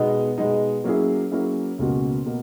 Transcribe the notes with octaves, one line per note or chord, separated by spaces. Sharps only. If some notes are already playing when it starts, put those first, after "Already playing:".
Already playing: B2 G#3 B3 D#4
B2 G#3 B3 D#4
F#3 A#3 C#4 E4 G#4
F#3 A#3 C#4 E4 G#4
C#2 B2 A#3 C#4 F#4
B2 A#3